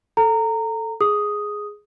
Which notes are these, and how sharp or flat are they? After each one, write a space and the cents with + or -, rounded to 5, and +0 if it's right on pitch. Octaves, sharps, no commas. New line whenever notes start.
A4 +0 A#5 -20
G#4 +0 D#6 +0